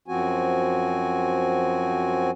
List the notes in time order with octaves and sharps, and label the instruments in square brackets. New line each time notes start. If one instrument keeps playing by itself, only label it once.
[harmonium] F#2 F3 C4 F#4 G#5